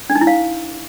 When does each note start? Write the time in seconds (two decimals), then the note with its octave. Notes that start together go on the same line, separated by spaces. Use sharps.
0.10 D4
0.15 D#4
0.21 E4
0.27 F5